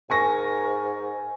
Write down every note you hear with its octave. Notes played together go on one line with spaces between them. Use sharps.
G#2 A#4 G#5 C#6 A#6